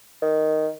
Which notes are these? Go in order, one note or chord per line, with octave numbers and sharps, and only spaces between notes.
D#3